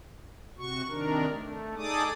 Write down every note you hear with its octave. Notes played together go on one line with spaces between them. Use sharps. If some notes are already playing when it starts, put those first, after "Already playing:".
C3 F#4 C#6
C3 D#3 D4 A#4
A3
D#4 G#4 A4 D5 D6 D#6